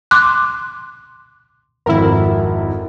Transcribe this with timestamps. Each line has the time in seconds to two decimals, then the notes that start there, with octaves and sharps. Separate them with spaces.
0.11 C6 D6 F#6
1.86 G#1 F2 E4 A#4